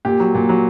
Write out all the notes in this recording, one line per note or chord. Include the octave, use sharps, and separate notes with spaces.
A#2 G4
F#3
A#2
F#3